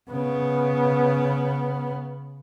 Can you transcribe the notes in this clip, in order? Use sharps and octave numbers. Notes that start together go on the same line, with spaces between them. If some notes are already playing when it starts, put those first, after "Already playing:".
C#3 B3